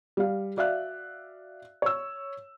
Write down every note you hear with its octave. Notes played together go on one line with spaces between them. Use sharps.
G3 F5
F#4 D5 E5 F5 F#6
C#5 E6